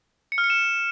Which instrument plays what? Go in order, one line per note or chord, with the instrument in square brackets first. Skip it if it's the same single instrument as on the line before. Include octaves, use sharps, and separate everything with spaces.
[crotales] C#7
F6
C#7
E7